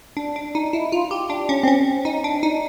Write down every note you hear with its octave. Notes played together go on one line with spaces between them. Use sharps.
D4
D4
D#4
E4
F4
G4
D4
C#4
C4
C#4
D#4
D4
D#4